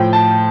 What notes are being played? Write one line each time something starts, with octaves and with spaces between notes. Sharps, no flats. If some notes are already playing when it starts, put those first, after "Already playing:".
Already playing: A2 F3 G5
A5